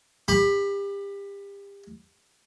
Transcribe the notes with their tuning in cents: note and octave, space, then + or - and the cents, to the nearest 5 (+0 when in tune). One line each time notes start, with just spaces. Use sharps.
G4 +30 B5 +0